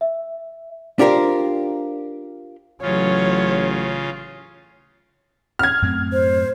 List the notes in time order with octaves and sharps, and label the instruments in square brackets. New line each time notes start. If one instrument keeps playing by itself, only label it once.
[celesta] E5
[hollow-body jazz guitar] D4 F4 G4 A#4 C5
[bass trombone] A1 [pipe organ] C#3 F4 [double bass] F#3 [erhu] C#5
[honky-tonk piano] F6 G#6
[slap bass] F#2 A2 C4
[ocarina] C5